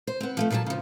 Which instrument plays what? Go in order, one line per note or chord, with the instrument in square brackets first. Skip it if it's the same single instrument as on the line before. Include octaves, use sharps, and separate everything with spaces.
[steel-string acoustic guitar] C5
B3 C4
F3 G#3 A3
A#2 F3 F#3 G#4 A5
C#3 F3